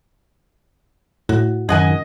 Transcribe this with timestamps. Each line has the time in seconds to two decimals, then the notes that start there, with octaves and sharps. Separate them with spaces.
1.29 A2 F#4
1.69 F#2 D#3 G#4 D#5 F#5 G#5